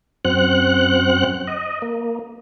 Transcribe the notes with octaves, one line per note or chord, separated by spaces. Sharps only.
F#2 C4 F#5 F#6
D#5
A#3